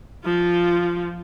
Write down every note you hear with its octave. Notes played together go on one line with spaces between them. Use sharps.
F3 F4